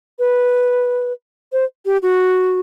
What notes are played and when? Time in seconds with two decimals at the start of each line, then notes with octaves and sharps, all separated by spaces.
0.19 B4
1.53 C5
1.86 G4
2.02 F#4